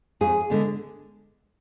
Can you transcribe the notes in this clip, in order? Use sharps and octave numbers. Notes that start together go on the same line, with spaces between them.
F2 G#4
D3 G#3 B3